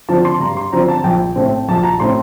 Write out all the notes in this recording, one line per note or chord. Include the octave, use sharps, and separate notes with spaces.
D3 F3 C4 A5
C6
G2 A#5
C6
D3 F3 C4 A#5
A5
A#1 G5
A2 A3 C4
A#1 A5
A#5
A2 A3 C4 C6